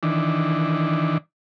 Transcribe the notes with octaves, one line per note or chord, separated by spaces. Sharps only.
D#3 E3 D4